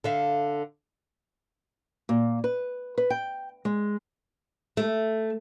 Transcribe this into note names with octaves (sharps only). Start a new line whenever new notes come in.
D3 E5 F5
A#2
B4
B4
G5
G#3
A3